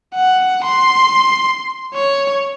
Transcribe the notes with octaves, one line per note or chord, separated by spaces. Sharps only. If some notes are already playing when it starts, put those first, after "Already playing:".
F#5
C6
C#5